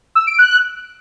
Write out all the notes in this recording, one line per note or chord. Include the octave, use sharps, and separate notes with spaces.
E6
D7
F#6